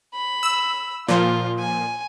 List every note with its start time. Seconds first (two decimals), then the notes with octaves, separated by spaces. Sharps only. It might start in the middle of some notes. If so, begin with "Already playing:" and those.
0.14 B5
0.43 E6
1.09 A#2 F3 F4
1.59 G#5